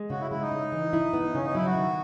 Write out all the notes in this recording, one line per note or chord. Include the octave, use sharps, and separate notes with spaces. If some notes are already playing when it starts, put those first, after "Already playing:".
Already playing: G#3
C#3 F#4
E4
G#3 E4
D#4
C#3
E3
E4
B3
C#3 C#4
D#4
F#3 E4
F#4
D#3